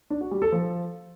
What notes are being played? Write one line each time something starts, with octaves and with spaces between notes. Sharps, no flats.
D4
F#4
G3
A4
F3